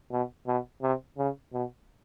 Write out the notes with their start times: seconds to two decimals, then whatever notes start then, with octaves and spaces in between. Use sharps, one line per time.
0.11 B2
0.47 B2
0.82 C3
1.18 C#3
1.53 B2